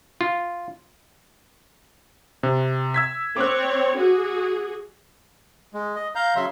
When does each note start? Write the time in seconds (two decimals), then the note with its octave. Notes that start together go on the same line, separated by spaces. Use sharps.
0.21 F4
2.43 C3
2.94 E6 G#6 B6
3.37 C4 C#5 D6 F#6
3.98 F#4 G#4
5.74 G#3
5.96 D#5
6.15 F5 A#5 G6
6.36 C#3 F#3 E5 C6